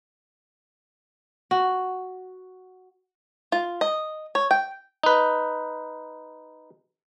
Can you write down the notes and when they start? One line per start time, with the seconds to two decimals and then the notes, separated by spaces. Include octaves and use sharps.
1.51 F#4
3.52 F4
3.81 D#5
4.35 C#5
4.51 G5
5.03 D#4 B4